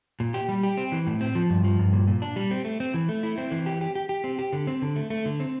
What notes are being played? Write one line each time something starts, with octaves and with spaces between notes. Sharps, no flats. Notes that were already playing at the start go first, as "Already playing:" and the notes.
A#2
G4
G3
G4
C4
E3
A2
C4
F3
G2
F3
G2
A#2
A#2
D4
G3
C4
A3
C4
E3
A3
E4
C4
E3
G4
G4
G4
G4
C4
G4
D3
C4
D3
A3
A3
D3
C4